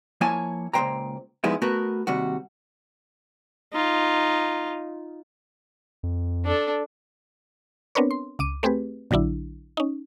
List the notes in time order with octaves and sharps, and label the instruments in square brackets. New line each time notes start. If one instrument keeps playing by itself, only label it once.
[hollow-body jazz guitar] F3 A#3 E4 C#5 G#5 A5
C#2 A#2 D#3 C5 G5 A#5
F3 G3 G#3 B3 D#4 E4
A3 B3 F#4 A#4 B4
D#2 C3 G3 F#4
[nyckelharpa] D#4 F4
[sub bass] F2
[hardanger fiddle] D4 A4
[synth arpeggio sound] B3 C4 D4 A#4 B4 C#5
C6
C#2 D6 D#7
A3 C4 G4 G#4 B4
A#1 D3 F#3 D4 E4
C#4 D#4